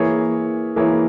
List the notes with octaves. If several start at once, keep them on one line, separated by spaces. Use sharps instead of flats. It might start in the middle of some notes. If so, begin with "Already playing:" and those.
Already playing: E3 A#3 E4 G#4 C#5
E3 A#3 E4 G#4 C#5